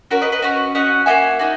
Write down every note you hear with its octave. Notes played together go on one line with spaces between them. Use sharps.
C#4 F#4 A#4 C#5
B4 D#5
B4 D#5
C#4 F#4
C#4 F#4 D#5 F#5
A#3 D#4 F#4 E5 G#5
D#4 F#4